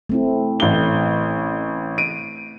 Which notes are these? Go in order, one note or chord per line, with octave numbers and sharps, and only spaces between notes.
A3 C4 E4
A1 G7
D7 D#7